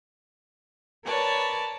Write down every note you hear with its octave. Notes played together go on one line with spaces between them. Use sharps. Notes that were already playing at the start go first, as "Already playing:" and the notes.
A#4 B4 C#5 D5 A5